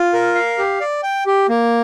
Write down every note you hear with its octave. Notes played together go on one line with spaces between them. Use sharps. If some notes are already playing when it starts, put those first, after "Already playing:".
Already playing: F4
A#4
F5
G4
D5
G5
G4
A#3